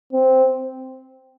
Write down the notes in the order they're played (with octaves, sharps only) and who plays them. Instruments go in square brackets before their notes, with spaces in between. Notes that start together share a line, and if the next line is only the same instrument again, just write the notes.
[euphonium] C4